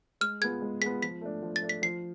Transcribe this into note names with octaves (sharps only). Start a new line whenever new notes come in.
G#3 F6
B3 F4 G#4 G#6
G#3
B3 F4 G#4 B6
F3 B6
A3 D4
F3
A6
A3 D4
B6
F3 C7